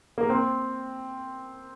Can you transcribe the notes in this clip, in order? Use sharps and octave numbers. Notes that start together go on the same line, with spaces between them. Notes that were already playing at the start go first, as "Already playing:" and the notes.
A#3
C4